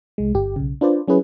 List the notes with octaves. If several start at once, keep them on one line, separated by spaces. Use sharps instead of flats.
C2 G#3
G1 G4
B1 C#3
D4 F4 B4 C5 D5
F#3 C#4 E4 G#4 B4